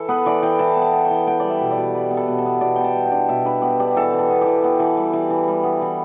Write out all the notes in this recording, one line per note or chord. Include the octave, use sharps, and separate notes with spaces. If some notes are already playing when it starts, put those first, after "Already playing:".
Already playing: E3 E4 A4
B3 B4
E3 D5
E3 G5
E3 A5
B3
A5
B3
G5
E3
B3 G5
G3 D5
E5
B2
D5
B2
G3 B4
B3
A4
B2
A4
B3
B2 D5
B3 G5
A5
G3
G5
D4
B2 E5
D4 B4
B3 G4
D4 G4
E3 A4
E3
A4
B3
E3 G4
B3
E3
G3
E3
E3
G3
B3
E3